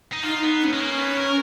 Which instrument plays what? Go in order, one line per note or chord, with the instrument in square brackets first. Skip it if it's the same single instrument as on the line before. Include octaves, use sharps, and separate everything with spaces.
[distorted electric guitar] D#4
[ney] D#4 [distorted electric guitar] F4
[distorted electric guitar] B3
[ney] D#4
C#4
[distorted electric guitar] G#3
A#3
B3
A#4